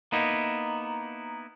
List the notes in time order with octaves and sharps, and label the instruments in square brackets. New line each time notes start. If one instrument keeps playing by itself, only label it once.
[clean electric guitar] A#3 B3 D#4 E4